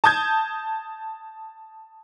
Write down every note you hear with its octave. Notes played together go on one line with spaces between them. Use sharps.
A5 D#6 G6 G#6